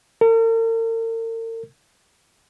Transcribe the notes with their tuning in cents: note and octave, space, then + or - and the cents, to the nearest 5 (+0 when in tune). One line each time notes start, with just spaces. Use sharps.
A#4 -45